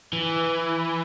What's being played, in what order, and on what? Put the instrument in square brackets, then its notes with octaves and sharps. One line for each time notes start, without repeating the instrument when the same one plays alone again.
[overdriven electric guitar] E3